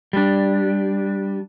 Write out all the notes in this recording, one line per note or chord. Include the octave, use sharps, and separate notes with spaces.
G3 D4